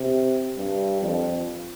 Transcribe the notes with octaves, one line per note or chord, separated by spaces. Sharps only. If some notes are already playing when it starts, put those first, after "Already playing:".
Already playing: C3
G2
F2